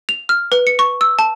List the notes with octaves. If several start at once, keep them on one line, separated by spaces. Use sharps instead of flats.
F7
F6
B4
C#7
C#6
E6
A5